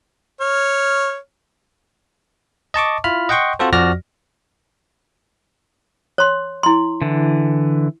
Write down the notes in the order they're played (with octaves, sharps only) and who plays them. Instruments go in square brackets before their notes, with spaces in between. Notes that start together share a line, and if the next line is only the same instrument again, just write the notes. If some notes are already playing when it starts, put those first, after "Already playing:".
[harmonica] C#5 F6
[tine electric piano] D#5 A5 C#6 D6
E4 F4 B5 F6
D#5 F#5 G5 C6 C#6
C4 F4 F#4 A4 C5
F2 F3 F#4 D5 F6 A#6
[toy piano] C#5 C6
E4 C6
[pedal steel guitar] D3 E3